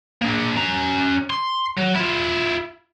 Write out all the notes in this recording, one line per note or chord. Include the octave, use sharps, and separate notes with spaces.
A#3 D4
C#4 A#5
C6
F#3
E4 F4